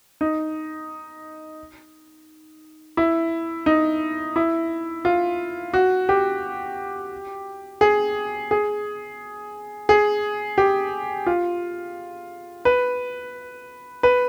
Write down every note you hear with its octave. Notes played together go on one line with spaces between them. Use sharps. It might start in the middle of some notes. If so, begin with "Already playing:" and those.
D#4
E4
D#4
E4
F4
F#4
G4
G#4
G#4
G#4
G4
F4
B4
B4